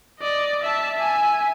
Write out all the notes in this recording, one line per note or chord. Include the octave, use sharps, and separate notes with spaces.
D5 D#5
E5 A5
E5 G#5